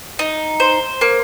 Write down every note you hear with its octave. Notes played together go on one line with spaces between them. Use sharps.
D#4
C5
A#3